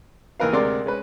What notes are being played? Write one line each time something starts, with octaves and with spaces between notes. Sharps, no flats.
D#2 E3 A#4 B4 F5
D2 C3 G#3 A#4 D5 C6
G#3 C#4 B4